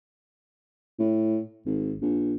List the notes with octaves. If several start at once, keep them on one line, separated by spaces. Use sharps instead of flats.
A2
G#1
A#1